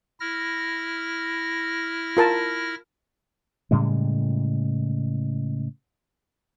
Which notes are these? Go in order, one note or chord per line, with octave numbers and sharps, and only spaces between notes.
E4 F6 A#6
F4 A#4 A5
A2 C#3 G3 G#3